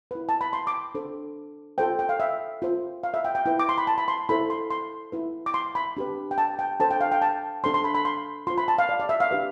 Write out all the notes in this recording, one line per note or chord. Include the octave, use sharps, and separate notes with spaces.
E4 B4
A5
B5
C6
D6
D4 A4 C5
F4 A4 C5 G5
G5
F5
E5
F4 C5
F5
E5
G5
G5
E4 B4 G5
D6
C6
B5
A5
B5
C6
E4 A4 C5 B5
C6
C6
E4 B4
D6
C6
B5
D4 G4 B4
G5
A5
G5
D4 A4 C5 A5
G5
F5
G5
A5
D4 A4 C5 C6
C6
B5
B5
C6
F4 C5 C6
B5
A5
F5
D5
D5
E5
F5
D4 G4 B4